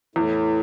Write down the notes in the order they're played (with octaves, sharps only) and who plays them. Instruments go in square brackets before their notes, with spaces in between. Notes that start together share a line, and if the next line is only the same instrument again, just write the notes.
[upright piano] E2 [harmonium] A2